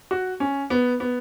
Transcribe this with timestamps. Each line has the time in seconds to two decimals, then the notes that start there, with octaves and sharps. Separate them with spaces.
0.11 F#4
0.40 C#4
0.70 B3
1.00 B3